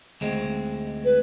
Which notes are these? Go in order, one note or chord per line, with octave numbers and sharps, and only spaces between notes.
D2 G#3 C4
B4